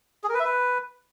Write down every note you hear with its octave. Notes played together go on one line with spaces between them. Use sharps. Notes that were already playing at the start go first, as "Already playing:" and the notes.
G#4
A#4
B4
E5
B4